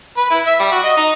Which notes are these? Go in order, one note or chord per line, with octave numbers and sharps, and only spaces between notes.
B4
E4
E5
G3
F#4
D#5
D#4